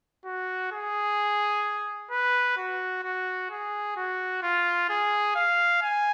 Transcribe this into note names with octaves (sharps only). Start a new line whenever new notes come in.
F#4
G#4
B4
F#4
F#4
G#4
F#4
F4
G#4
F5
G#5